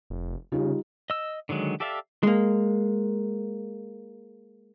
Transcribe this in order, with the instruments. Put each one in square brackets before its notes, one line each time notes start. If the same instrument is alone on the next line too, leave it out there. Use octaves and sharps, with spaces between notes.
[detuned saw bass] F1
[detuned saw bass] C#3 [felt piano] G3 D#4 F4
[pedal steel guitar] D#5 E6
D3 D#3 F#3 G#3
G4 A4 D5 E5 F5
[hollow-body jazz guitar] G#3 A#3